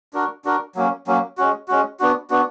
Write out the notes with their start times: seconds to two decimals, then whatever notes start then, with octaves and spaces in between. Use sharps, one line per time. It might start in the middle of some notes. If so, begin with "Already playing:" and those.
0.13 D4 F#4 A#4
0.45 D4 F#4 A#4
0.75 F#3 A#3 C#4
1.07 F#3 A#3 C#4
1.38 G#3 C#4 F#4
1.68 G#3 C#4 F#4
2.00 B3 D4 F#4
2.30 B3 D4 F#4